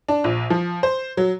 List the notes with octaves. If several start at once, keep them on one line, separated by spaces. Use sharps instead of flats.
D4
A#1
F3
C5
F#3